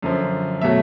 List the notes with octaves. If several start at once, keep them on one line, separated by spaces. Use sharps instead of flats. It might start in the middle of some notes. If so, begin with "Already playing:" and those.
F#2 D3 F3
B2 F#3 A3 E5